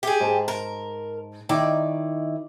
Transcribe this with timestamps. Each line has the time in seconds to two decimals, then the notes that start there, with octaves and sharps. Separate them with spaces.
0.03 G4 G#4
0.20 G#2 A5
0.48 A#4
1.49 D#3 D#4 E4 D5